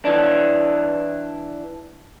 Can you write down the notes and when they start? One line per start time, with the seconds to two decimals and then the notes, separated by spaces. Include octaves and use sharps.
0.05 E3 D4